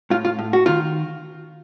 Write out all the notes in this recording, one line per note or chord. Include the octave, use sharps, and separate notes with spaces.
A2 F4
F4
A2
F#4
D#3 F4